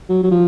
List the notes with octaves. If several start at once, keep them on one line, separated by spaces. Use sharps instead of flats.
F#3
F#3
F3